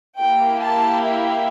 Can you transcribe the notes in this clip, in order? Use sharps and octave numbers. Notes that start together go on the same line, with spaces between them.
A#3 E4 G4 G5
A5
E5